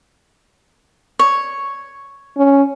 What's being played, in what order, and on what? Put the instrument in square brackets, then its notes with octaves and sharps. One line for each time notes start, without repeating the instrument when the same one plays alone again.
[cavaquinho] C#5
[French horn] C#4